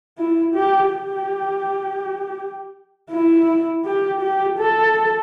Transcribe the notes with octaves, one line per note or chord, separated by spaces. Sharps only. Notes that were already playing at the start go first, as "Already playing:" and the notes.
E4
G4
G4
E4
G4
G4
A4